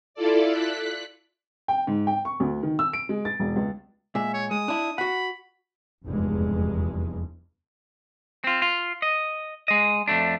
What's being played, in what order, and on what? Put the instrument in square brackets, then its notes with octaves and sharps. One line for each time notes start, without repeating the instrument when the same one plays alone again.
[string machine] E4 F4 A4 D5
F#6 B6
[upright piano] G5
G#2
G5
C#6
D2
D#3
E6
D7
G#3
A6
E1
C#2
[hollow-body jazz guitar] A#2 G#3 [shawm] E5
[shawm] C#5
[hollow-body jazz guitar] G#3 [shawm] D#6
[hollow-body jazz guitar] D4 E4
[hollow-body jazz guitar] F#4 F#5 [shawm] B5
[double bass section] F1 E2 G2 G#3
[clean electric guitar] C4 F4
F4
D#5
G#3 D#5
F2 A3 D4